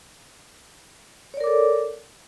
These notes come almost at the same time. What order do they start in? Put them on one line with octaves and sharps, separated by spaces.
C#5 D5 A#4 D6 A4